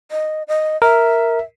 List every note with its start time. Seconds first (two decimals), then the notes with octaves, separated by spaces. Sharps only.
0.11 D#5
0.48 D#5
0.82 A#4 E5